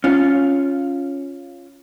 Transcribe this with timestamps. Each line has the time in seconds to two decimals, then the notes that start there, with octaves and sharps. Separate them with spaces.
0.04 C#4 F4